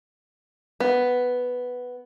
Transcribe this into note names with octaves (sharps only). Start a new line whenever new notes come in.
B3